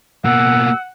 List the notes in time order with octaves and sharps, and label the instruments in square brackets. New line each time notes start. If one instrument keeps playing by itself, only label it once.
[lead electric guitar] B2 A#3 [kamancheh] F#5 [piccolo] E6